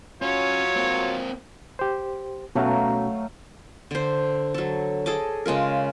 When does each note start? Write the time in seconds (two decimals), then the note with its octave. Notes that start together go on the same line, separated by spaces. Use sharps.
0.22 F#3 C#4 F4 C#5
0.77 A#3 C4
1.79 G4 C5
2.55 B2 F#3 A3 C#4 F#4 F5
3.91 D3 C5
4.54 F#3 A4
5.06 G#4 A4 D#5 D6
5.46 C#3 G#3 F4 A#4